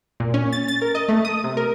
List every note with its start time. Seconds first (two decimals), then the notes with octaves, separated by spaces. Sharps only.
0.20 A#2
0.34 C#4
0.53 A6
0.68 A6
0.82 A#4
0.95 D#5
1.09 A3
1.25 D#6
1.44 C3
1.57 A#4